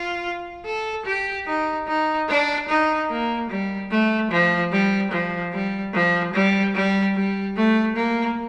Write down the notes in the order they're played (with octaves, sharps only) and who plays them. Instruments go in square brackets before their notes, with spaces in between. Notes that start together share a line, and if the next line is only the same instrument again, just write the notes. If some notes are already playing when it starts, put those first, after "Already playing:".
Already playing: [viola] F4
A4
G4
D#4
D#4
D4
D#4
A#3
G3
A3
F3
G3
F3
G3
F3
G3
G3
G3
A3
A#3